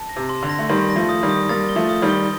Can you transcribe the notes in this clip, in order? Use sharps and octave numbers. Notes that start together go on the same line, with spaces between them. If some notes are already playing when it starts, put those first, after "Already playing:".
Already playing: A5
A#6
C3
C6
D3
A#6
A3
D#3 G3 C6
A#6
F3 A3
D#6
D#3 G3
D#6
G3 A#3 A6
G7
F3 A3
D#6
D#3 G3
G7